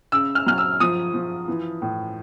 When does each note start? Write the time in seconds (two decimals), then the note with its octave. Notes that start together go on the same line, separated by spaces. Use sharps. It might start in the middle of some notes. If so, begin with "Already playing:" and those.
0.12 C#3 E6
0.35 F6
0.46 F#3 F6
0.58 E6
0.80 F3 D#6
1.14 F3
1.48 E3
1.82 A2